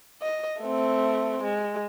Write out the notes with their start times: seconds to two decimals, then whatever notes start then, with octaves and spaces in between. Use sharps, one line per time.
0.22 D#5
0.61 A3 C4
1.43 G#3